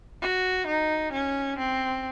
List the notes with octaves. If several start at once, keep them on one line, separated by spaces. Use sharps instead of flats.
F#4
D#4
C#4
C4